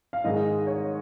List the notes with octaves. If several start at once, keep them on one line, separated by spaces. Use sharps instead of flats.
F5
G#2 D#3 G#3 D#5
C#5